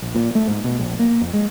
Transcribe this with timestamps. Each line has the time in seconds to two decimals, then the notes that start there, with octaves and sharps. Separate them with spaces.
0.02 A#1
0.15 A#2
0.35 A3
0.47 G#2
0.64 B2
0.80 A#1
0.99 A#3
1.21 F2
1.33 G#3